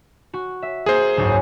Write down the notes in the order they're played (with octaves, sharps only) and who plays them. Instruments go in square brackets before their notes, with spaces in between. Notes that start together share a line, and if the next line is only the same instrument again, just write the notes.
[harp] F#4
E5
[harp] A#3 [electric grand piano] G#4 C5
[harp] F#1 C#2 G#2